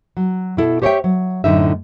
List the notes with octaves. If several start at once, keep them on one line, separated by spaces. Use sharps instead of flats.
F#3
B2 E4 A4
G4 C5 C#5 D#5 E5 G5
F#3
F#2 A2 D3 D#4 E5